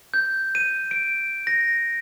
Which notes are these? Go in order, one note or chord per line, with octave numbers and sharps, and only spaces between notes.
G6
D#7
D7
A#6